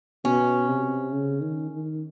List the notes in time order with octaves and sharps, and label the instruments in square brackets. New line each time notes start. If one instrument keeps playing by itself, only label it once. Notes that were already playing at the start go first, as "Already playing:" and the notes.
[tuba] B2 [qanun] C#4
[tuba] C3
C#3
D#3
D#3